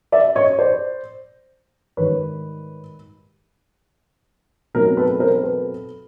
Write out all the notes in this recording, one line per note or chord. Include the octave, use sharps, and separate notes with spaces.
D5 E5
C#5 D#5
C5 D5
G#2 D#3 G3 B4 C#5
B2 F#3 A3 C4 D#4 A#4
A4 B4
A#4 C5
A4 B4